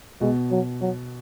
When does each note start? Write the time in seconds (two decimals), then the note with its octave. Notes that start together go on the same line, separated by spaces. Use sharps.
0.21 B2 G#3
0.51 F#3
0.81 F#3